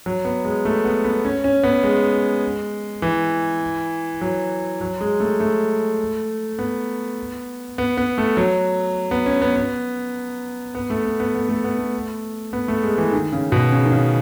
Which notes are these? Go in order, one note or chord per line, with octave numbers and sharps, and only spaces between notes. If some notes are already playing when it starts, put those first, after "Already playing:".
F#3
B3
G#3
A3
B3
B3
C#4
C#4
B3
G#3
E3
F#3
F#3
G#3
A3
A3
B3
B3
B3
A3
F#3
B3
C#4
B3
B3
B3
A3
B3
B3
B3
A3
B3
A3
B3
A3
G#3
E3
D#3
C#3
B2
C#3
D#3
C#3